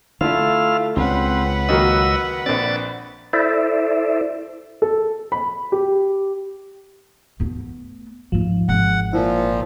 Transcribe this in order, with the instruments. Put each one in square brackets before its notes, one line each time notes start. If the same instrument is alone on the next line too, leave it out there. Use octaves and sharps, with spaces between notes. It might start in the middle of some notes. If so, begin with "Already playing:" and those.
[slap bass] D3 [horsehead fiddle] A3 [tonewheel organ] E4 F4 F5
[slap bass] C#2 C#3 [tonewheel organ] C4 [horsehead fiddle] B4 F#5
[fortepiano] D#3 F#3 A#3 [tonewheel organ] D#5 E6
[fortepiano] A#1 C4 [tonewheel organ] D5 A6
[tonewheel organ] E4 A4 C5 D5 E5
[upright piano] A4
B5
G4
[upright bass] A3 B3
[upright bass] D#2 G#2 [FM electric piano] F3
[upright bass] G#1 [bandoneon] F#5
[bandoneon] A#2 F3 [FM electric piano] E4